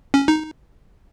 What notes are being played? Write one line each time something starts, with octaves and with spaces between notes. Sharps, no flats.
C#4
D#4